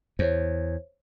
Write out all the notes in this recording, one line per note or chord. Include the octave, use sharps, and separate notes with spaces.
E2 C5 C#5